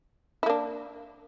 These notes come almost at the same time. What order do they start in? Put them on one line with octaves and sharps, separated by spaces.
E4 A#3 D4